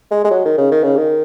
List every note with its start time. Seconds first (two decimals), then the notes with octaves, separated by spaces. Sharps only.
0.11 G#3
0.24 G#3
0.31 F#3
0.45 D#3
0.58 C#3
0.72 D#3
0.83 C#3
0.97 D#3